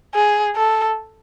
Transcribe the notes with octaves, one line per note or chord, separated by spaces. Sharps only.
G#4
A4